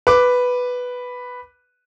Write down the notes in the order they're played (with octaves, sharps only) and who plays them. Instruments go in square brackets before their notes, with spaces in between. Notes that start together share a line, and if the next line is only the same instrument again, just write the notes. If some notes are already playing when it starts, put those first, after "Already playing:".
[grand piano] B4 D6